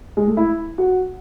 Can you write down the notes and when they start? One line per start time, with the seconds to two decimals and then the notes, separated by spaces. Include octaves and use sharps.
0.17 G#3
0.27 A3
0.37 E4
0.78 F#4